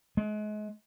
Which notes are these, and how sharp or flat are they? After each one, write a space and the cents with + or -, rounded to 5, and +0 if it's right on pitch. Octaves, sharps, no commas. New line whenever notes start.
G#3 +35